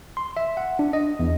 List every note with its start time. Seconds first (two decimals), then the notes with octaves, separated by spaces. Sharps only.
0.17 C6
0.37 E5
0.57 F#5
0.79 D4
0.93 D#5
1.19 E2